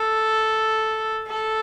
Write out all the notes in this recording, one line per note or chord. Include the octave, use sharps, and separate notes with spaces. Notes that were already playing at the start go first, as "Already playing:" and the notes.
Already playing: A4
A4